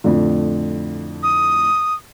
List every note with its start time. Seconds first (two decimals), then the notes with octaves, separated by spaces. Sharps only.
0.04 F2 A2 D3
1.23 D#6